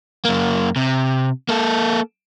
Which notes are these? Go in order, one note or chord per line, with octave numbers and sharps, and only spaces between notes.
F#2 A#3
C3
A#3 A4